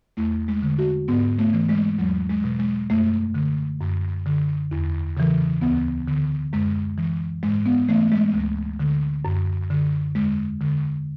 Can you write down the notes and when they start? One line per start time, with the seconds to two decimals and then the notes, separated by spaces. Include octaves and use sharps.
0.17 E2 A3
0.48 G#3
0.63 D3
0.78 F#4
1.08 G#2 B3
1.39 A3
1.53 E3
1.69 G#3
1.99 E2 F#3
2.29 G#3
2.44 B2
2.59 G#3
2.90 F#2 A3
3.34 D3
3.81 F#2
4.26 D3
4.71 E2
5.17 C#3 E3
5.61 D2 B3
6.08 D3
6.53 F#2 G#3
6.98 E3
7.43 G#2 G#3
7.66 B3
7.89 E3 A3
8.12 G#3
8.34 D2
8.79 D3
9.25 F#2
9.70 D3
10.15 E2 G#3
10.61 D3